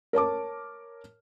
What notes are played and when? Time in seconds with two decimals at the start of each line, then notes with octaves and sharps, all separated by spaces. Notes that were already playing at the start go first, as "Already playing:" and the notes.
0.13 A#4 C#5 A5 D6